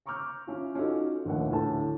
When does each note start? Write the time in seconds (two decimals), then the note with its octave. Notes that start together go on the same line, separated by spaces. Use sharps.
0.06 A#5 C#6 D6 E6 F6 G6
0.47 C#4 E4 F4
0.75 C#4 D#4 F4 F#4 A4
1.25 A#1 D#2 A3 D#4 B4 F#5
1.49 D2 A2 A5